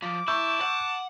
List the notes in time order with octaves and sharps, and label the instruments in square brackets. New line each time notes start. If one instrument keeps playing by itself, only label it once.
[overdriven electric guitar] F3 [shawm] D6
[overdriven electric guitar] E4 [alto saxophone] A5 [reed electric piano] C#6 E6 G6
[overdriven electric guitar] F#5